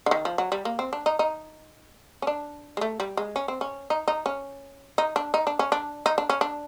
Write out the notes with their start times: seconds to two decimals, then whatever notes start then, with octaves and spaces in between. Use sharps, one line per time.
0.06 D3
0.11 D#3
0.25 F3
0.38 F#3
0.52 G3
0.65 A#3
0.79 C4
0.93 D4
1.06 D#4
1.19 D#4
2.22 C#4
2.27 D4
2.77 G#3
2.81 A3
3.00 G3
3.17 G#3
3.36 C#4
3.48 C4
3.61 C#4
3.90 D#4
4.08 D#4
4.26 C#4
4.98 D#4
5.16 D4
5.34 D#4
5.47 D4
5.59 C#4
5.72 D4
6.06 D#4
6.18 D4
6.29 C#4
6.41 D4